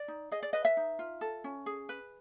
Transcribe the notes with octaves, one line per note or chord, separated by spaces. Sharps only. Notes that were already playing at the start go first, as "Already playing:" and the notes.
Already playing: D5
D#4
G#4 D#5
D5
B4 D#5
E5
D#4
F4
A4
C#4
G#4
B4